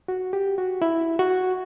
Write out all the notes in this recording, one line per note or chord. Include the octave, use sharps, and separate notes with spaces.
F#4
G4
F#4
E4
F#4